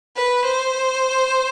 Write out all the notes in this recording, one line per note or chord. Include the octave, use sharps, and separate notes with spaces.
B4
C5